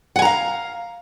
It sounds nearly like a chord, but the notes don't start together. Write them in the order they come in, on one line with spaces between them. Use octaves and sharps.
F#5 G#5 A#5 F5